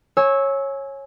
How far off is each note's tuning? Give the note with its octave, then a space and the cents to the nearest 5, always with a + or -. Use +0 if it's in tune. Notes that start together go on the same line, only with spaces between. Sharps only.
C#5 -15 G#5 +15 E6 -15